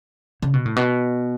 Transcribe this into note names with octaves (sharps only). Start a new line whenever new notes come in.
C#3
B2
A2
B2